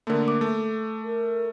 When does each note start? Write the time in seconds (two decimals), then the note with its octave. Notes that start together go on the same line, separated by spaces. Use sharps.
0.07 D3 A3 A#3 A#4
0.28 D6
0.41 A3
1.03 A#4